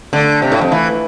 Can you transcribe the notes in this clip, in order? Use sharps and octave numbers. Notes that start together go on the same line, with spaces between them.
D3 A3 D4 A4 D5
C3
A2
F2
E3 A3 E4 B4